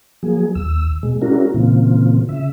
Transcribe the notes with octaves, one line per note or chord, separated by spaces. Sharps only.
F3 F#3 A#3 G#4
D#2 E6
B2 G#3
G#3 C#4 D4 E4 F#4 A#4
A#2 C#3 E3 A#3 C4 F4
C#3 E5